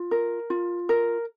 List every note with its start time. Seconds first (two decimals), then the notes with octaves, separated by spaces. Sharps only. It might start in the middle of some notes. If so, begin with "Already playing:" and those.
Already playing: F4
0.11 A#4
0.50 F4
0.89 A#4